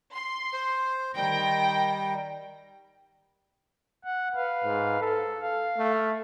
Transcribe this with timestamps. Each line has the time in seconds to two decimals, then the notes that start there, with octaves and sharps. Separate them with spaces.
0.15 C6
0.53 C5
1.16 D#3 G3 G5 A#6
4.05 F#5
4.35 B4 F5
4.64 G#2
5.00 A4
5.41 F5
5.78 A3